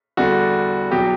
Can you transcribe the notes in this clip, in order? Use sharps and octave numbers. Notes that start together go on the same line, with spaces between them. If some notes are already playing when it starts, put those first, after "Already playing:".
E2 D3 G3 F#4
E2 B2 F#3 G4